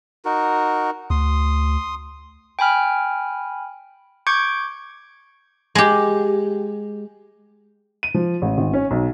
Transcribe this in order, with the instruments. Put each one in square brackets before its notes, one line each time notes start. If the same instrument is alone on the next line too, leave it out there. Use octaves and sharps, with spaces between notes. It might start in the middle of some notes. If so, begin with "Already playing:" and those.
[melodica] D#4 F#4 A#4
[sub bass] D2 [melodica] C6 D#6
[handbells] G5 G#5 B5 F6
C#6 D6 G6 G#6 C#7 D7
[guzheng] G#3 G4
[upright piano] D#7
F3
A1
G#1
C#4
B1